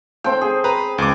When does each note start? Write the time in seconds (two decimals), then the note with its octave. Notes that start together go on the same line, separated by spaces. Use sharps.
0.24 C4 A4 G5
0.41 G#4
0.64 B4 A#5
0.98 C#2 D6